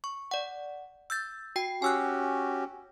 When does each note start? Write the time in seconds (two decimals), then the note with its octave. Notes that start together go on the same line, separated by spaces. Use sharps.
0.04 C#6
0.31 D5 F#5
1.10 E6 G6 A6
1.56 F#4 G5 C7
1.82 C#4 F#4 G4 G#5 E6 F#6